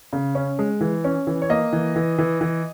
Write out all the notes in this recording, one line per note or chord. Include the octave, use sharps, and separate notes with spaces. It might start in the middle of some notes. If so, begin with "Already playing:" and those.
C#3
C#4
G#3
E3
C#4
E3
C#5
A#3 D#5
E3
E3
E3
E3